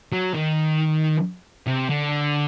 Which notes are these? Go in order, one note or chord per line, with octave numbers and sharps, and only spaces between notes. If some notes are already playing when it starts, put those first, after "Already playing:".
F#3
D#3
C3
D3